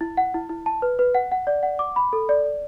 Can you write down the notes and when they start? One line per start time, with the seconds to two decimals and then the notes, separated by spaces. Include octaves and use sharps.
0.01 E4
0.17 F#5
0.34 E4
0.49 E4
0.66 A5
0.82 B4
0.99 B4
1.15 F#5
1.32 F#5
1.47 D5
1.63 F#5
1.79 D6
1.96 B5
2.13 A4
2.29 D5
2.44 D5